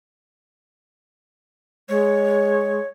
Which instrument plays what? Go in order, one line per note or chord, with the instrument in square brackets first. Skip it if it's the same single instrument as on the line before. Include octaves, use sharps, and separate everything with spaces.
[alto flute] G#3 [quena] C#5